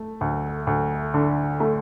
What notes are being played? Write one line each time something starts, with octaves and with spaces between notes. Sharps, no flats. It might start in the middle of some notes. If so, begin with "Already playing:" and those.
Already playing: A3
D2
D2
D3
A3